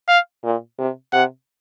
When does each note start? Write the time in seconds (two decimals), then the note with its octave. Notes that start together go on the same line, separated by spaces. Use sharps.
0.08 F5
0.44 A#2
0.78 C3
1.13 C3 F#5